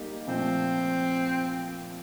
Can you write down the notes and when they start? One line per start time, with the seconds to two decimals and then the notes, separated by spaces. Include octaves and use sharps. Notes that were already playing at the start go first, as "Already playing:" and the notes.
Already playing: G3 A#3 D#4 G4
0.27 A#2 F3 A3 C4